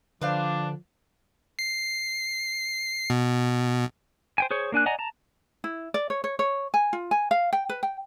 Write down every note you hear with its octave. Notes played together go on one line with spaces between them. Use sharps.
D3 F3 D4 B4 C5 F5
C7
B2
C5 G5 G#5
G#4 C5 C#5
A#3 D4 G#5 F#6
D5 D#5 F#5 G#5 A#5
A5 A#5
E4
D5
C#5
C#5
C#5
G#5
F4
G#5
F5
G5
B4
G5